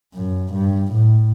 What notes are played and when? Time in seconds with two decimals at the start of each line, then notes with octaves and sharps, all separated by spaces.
0.14 F#2
0.54 G2
0.92 A2